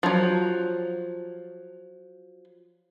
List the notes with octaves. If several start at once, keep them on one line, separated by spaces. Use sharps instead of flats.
F3 F#3